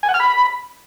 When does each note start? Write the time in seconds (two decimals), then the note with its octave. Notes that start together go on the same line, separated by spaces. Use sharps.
0.03 G#5
0.09 F#5
0.14 F6
0.20 B5